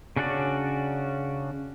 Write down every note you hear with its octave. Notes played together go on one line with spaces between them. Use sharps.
C#3 C#4 D4 F#4 D5